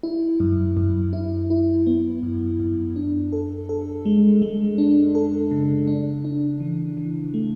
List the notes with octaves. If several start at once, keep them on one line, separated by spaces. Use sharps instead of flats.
E4
F#2
F#2
E4
E4
B3
F#2
F#2
D4
A4
A4
G#3
G#3
D4
A4
C#3
D4
D4
E3
E3
A3